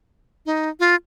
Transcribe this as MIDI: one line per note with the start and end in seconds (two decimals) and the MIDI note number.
0.46 0.69 63
0.80 0.95 65